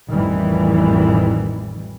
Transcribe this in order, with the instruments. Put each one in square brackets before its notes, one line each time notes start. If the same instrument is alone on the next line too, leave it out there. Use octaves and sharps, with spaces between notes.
[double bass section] A1 F2 D#3 E3 G3